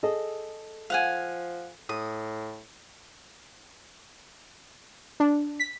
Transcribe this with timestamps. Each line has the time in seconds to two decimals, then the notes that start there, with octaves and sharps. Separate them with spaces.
0.03 G#4 A4 D#5
0.90 F3 F5 F#5 G#5
1.89 A2 D#6
5.20 D4
5.60 B6